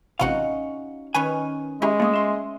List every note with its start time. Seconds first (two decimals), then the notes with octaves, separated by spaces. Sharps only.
0.19 A1 C3 C#4 D#4 F4 F#4 F5 F#5
1.14 D#3 C#4 B4 G#5
1.82 G#3 C#4 E4 G4 G#4
2.00 A3 A#3 F4 D#5
2.13 E5 C6